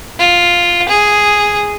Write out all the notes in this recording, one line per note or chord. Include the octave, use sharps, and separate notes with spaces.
F4
G#4